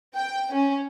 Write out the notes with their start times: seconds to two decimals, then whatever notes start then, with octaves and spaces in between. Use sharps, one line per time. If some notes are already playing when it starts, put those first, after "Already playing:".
0.17 G5
0.54 C#4